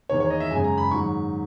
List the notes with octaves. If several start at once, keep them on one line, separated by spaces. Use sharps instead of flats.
E2 D#3 A#3 C#5
C#5
D#5
E5
F#2 C#3 G#3 G#5
A#5
B5
G#2 D#3 F#3 C#6